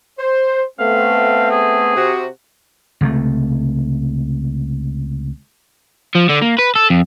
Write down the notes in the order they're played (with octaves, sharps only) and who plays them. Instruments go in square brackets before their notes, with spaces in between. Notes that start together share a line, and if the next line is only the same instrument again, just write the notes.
[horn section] C5
[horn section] A3 B3 C4 [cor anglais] F5
[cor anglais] G#4
[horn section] C3 F#4
[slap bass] C#2 C3 A3
[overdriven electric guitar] F3
D3
A#3
B4
A4
F2